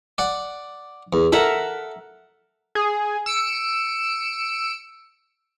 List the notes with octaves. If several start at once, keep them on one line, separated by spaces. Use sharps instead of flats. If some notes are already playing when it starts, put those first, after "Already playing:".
D5 F#5
E2
A4 A#4 E5 F#5
G#4
E6 C#7 D7